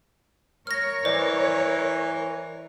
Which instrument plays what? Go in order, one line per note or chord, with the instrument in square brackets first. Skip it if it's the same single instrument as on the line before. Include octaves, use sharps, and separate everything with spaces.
[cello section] A#4 C#5 [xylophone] F6 A#6
[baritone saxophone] E3 [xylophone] C5 [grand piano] D5